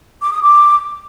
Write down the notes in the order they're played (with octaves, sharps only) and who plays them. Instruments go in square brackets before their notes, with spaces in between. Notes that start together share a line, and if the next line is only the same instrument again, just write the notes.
[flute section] D6
D#6
D6